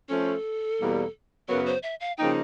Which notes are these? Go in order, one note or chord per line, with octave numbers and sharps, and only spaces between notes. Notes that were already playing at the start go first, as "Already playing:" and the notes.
F3 A3 C#4 A4
E2 B2 G3 A#3
F#2 C#3 F#3 B3 A#4
C5
E5
F5
C#3 F3 A#3 D#4 G5